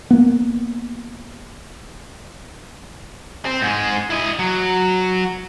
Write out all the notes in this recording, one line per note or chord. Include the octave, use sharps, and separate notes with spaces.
A#3 B3
C4
G#2 G#3
E4 D#5
F#3